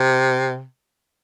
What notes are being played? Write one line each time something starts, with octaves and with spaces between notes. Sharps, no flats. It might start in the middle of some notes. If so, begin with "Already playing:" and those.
Already playing: C3